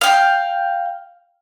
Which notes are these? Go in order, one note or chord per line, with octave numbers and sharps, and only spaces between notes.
F5 G5